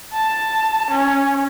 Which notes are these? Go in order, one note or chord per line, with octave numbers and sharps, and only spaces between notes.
A5
C#4